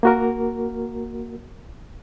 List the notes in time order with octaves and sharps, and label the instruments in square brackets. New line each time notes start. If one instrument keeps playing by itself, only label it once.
[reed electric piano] A#3 F#4 A#4